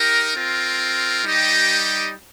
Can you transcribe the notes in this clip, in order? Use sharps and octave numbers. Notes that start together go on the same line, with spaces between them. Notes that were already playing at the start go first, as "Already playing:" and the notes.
Already playing: D#4 G4 A#4
C4 F4 A#4
G3 D#4 G4 D#5 G5